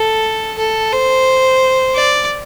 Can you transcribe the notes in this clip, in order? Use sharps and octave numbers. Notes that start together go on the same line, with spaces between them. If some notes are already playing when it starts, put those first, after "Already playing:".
Already playing: A4
A4
C5
D5